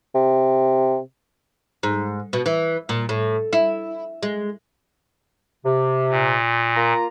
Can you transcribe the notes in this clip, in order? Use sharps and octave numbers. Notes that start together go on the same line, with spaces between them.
C3
G#2
B2
E3
A#2
A2
E4
G#3
C3
A#2
A#3 F4 A#5